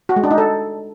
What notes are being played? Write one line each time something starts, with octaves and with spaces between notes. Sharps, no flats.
F#4
G#3
D4
D#4
A4